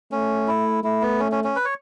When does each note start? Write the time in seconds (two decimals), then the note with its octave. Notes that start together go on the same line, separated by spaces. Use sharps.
0.12 A3 C#4
0.48 E4
0.83 A3 E4
1.02 B3
1.20 C#4
1.32 C#4
1.44 C#4
1.56 B4
1.65 C#5